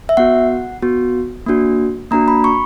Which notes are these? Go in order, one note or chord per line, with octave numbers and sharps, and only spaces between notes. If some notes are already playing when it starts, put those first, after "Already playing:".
E5
B3 F#4 F#5
B3 F#4
A#3 D4 F#4
A#3 D4 F#4 A#5
B5
C#6